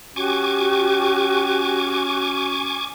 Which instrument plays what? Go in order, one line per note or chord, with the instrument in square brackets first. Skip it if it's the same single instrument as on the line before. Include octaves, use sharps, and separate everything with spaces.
[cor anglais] C#4 [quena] F#4 [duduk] G4 [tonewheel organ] G#5 C#6 D6